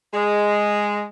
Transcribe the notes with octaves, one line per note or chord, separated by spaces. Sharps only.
G#3